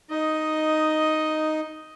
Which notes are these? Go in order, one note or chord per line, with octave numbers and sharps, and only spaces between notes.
D#4 D#5